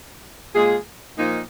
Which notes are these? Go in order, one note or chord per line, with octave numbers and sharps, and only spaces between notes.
A#2 G#3 F4 G#4
A#2 F3 A#3 D#4